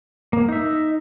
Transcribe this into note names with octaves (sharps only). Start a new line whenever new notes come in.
A#3
D#4 E5